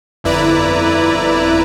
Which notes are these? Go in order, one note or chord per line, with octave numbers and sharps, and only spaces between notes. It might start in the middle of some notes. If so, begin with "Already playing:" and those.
G1 F2 E4 B4 D5 A#5